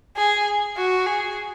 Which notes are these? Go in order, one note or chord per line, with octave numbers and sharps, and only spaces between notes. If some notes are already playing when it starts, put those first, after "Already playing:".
G#4
F#4
G#4